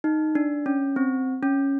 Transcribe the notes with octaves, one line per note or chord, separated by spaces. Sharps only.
D#4
D4
C#4
C4
C#4